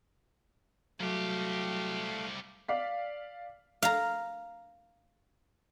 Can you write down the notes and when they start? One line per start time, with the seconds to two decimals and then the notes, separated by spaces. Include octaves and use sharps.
1.00 C2 F#3 A3 G4 F5
2.69 D5 F5 B6
3.83 F5 A#5